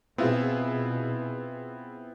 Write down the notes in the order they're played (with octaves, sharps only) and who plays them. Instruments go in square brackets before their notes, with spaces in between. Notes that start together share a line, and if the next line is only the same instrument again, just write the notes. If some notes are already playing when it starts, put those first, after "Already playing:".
[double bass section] B2 [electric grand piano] B3 C4 [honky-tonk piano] E4 F4 G#4